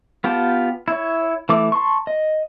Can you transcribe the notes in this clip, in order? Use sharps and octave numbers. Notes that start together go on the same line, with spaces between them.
B3 F4 G4 G5 A5
E4 C#5
E3 A3 D6
A5 C6 C#6
D#5